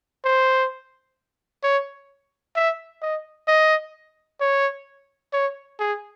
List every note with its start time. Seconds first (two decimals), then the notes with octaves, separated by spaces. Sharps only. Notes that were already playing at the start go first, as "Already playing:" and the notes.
0.24 C5
1.63 C#5
2.56 E5
3.02 D#5
3.48 D#5
4.40 C#5
5.33 C#5
5.79 G#4